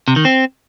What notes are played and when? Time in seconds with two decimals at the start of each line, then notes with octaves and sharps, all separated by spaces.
0.08 C3
0.16 D#3
0.25 C4